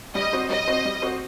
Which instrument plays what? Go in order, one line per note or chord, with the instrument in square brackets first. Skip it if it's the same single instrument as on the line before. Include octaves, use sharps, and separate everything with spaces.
[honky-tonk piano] G3 [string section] D#5
[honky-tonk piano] C4 F#4 C5
[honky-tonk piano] G3 [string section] D#5
[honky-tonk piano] C4 F#4 C5
G3
C4 F#4 C5